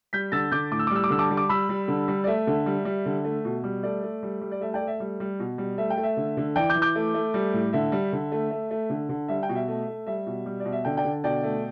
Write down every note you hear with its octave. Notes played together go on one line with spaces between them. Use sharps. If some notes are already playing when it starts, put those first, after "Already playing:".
G3 G6 B6
D3 E6 A6
D3 D6 G6
A2 D6
E6
D6
G3
E6
D6
D3 E6
A5 D6
G3
D6
G3 B5 E6
G3
D3
G3
D5
A3 E5
D3
G3
G3
D3
A3
B2
G3
A3 D5
A3
G3
G3
D5
A3 E5
D5 G5
A3
E5
G3
G3
B2
G3
A3 E5
G5
A3
E5
D3
D3
E3 D5 G5
D6 G6
E3
D6 G6
A3
A3
G3
A2
D3 E5
G3
D3
A3
A3
A3
D3
D3
G3 E5
G5
B2
E5
A3
A3
G3 E5
B2
G3
B2 D5
E5
D3 D5 G5
D5 G5
D3
B2 D5 G5
A3